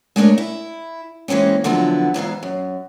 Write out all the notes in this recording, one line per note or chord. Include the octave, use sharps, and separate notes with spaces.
G#3 A3 D4 A#4 C#5
E4
E3 G#3 A#3 C4 C#4
D3 F3 F#3 B3 E4 A4
E2 G#2 E3 F5
F#2